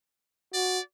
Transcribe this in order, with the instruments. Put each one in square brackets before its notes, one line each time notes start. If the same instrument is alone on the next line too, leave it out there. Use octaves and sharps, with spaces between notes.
[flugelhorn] F#4 [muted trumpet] D5